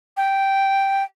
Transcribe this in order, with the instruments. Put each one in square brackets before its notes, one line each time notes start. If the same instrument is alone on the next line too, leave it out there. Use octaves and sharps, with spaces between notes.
[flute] G5